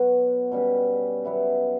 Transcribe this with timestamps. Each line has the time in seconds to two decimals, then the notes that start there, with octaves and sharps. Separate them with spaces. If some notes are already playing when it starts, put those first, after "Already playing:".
Already playing: B2 F#3 B3 F#4
0.52 B2 G3 C#4 G4
1.24 F#3 B3 E4 G4